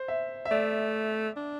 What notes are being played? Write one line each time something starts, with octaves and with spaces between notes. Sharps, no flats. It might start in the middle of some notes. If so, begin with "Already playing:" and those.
Already playing: C5
E5
E5
A3 D5
D4